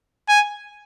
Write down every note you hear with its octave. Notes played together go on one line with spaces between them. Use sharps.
G#5